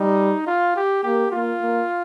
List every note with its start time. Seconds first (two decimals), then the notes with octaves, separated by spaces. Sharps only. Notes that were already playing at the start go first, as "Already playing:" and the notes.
Already playing: G3 D#4
0.47 F4
0.76 G4
1.03 A#3 G4
1.32 A#3 F4
1.61 A#3